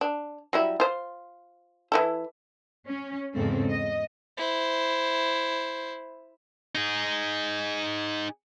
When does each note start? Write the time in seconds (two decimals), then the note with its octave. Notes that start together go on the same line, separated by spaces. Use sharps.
0.01 D4
0.53 F#3 G3 E4
0.80 F4 C5
1.92 E3 E4 A4
2.87 C#4
3.34 E2 G#2 C#3 C4 A4
3.70 D#5
4.37 E4 C5
6.75 D#4 G#4